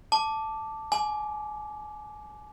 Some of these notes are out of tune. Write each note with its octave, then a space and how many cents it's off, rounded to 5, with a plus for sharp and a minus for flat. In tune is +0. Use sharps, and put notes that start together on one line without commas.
A5 +0 D6 +0
G#5 +25 D6 +0